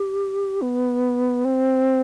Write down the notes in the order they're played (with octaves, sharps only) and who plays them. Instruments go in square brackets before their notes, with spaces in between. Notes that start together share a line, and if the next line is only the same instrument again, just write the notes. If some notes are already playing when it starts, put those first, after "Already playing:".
Already playing: [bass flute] G4
B3
C4